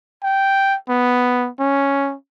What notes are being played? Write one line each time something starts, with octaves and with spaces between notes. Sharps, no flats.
G5
B3
C#4